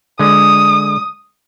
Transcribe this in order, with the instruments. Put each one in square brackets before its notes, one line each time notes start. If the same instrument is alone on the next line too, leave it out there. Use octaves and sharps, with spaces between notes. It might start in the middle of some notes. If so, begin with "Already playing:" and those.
[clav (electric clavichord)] D3 G#3 [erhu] D#6